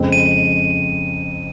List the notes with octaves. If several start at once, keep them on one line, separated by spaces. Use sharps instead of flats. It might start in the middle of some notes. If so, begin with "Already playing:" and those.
Already playing: F2 C#3 G#3 C4
D#7